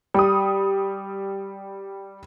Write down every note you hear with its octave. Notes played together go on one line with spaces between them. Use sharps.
G3 D#6